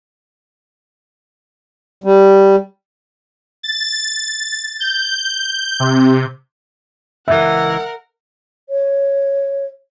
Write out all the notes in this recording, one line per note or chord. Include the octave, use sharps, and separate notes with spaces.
G3
A6
G6
C3
C#2 E3 A#4 E5 F#5
C#5